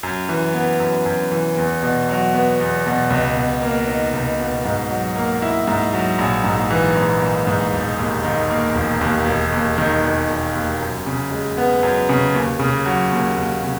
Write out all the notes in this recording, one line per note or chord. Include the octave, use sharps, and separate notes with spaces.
F#2
E3
B3
F#2
F#2
E3
E2
B2
F#3
B3
E2
B2
C#2
B2
A#3
D#4
C#2
B2
G#2
F#3
A#3
E4
G#2
F#3
A#1
G#2
E3
A#1
A#1
G#2
E1
D#2
D#3
A#3
E1
D#2
E1
D#2
D#3
E1
E1
D#2
F#2
C#3
G#3
B3
F#2
C#3
D#2
C#3
F#3
D#2
D#2
C#3